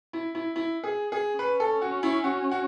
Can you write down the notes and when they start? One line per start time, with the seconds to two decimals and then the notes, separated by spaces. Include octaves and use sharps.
0.13 E4
0.35 E4
0.56 E4
0.84 G#4
1.12 G#4
1.39 C#4 B4
1.60 A4
1.82 F#4
2.03 E4
2.24 F#4
2.51 F#4